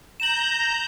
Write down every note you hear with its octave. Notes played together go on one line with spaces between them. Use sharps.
A#5 G6 E7 F#7